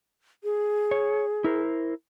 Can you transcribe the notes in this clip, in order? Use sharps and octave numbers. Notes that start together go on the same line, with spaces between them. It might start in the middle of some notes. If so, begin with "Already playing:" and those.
G#4
C#5
E4 A#4 C5